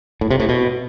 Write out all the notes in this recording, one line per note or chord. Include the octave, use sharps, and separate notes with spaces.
A2
C3
A2
B2